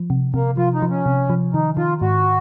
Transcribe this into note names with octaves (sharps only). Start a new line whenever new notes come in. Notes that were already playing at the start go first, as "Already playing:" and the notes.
Already playing: F3
C3
C3 A#3
F3 F4
D#4
F3
C#4
C3
F3
D#3 D#4
D#3 F4
G#2 F#4